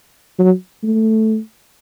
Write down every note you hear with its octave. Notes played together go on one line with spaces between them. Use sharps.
F#3
A3